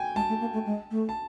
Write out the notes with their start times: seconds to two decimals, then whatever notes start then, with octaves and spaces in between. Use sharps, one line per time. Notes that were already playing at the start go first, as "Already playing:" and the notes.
Already playing: G5 G#5
0.15 G#3 A5
0.29 A3
0.40 A#3
0.53 A3
0.66 G#3
0.91 A3
1.09 A5